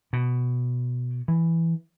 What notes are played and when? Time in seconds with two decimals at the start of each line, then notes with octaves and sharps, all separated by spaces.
0.13 B2
1.28 E3